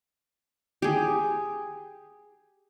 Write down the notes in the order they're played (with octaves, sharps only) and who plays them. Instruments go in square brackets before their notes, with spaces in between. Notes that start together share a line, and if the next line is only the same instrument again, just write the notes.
[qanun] G4 G#4